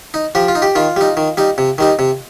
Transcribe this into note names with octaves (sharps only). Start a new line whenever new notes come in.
D#4
F3 G4
F4
D#4
G4
D#3 F4
G3 D#4
D#3
G3 D#4
C3
D#3 G3 D#4
C3